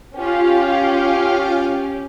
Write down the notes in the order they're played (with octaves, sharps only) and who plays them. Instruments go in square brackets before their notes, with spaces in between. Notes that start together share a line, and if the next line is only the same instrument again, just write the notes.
[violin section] C#4 G4 [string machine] F4 F5